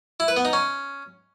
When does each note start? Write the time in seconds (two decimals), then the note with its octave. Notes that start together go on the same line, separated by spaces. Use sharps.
0.20 E4
0.28 B4
0.36 B3
0.45 D#4
0.53 C#4